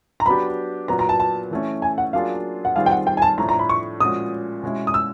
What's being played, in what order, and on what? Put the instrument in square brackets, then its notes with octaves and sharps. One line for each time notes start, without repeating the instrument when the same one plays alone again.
[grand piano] A#5
[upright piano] F#3 B3 D4 G4 [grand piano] B5
[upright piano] A#2 F#3 B3 [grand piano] A#5
[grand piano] A#5
A5
A5
[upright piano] E3 A3 C#4
[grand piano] G#5
F#5
[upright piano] F#3 A#3 D4 F4 G#4 [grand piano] F5
[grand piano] F#5
[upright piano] D#3 G3 C4 F4 G#4 [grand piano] F5
[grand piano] G5
F#5
G5
G#5
A5
[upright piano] A2 F3 A3 D4 [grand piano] A#5
[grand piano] A#5
B5
C#6
[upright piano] A#2 F3 G#3 C#4 F#4 [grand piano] D#6
[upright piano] B2 G#3 C#4 E4
[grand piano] D#6
E6